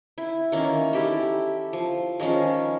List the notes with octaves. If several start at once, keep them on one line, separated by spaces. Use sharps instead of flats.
E4
D#3 E3 A#3 C#4
E4 G4 A4
F3
D#3 F3 G#3 C#4